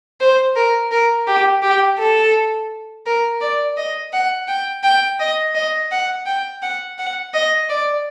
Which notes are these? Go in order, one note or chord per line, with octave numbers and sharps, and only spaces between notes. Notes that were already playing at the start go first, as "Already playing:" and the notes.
C5
A#4
A#4
G4
G4
A4
A#4
D5
D#5
F#5
G5
G5
D#5
D#5
F#5
G5
F#5
F#5
D#5
D5